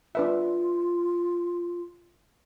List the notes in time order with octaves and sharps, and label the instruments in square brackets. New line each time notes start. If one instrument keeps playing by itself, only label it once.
[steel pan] D4 B4 E5 [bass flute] F4